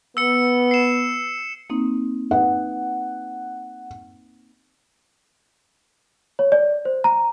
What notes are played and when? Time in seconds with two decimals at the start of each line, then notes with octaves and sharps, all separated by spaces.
0.17 B3 E6 C#7
0.71 C7 E7
1.70 A#3 C4 D#4
2.31 D#4 B4 F#5
6.39 C#5
6.52 D5
6.85 C5
7.04 A#5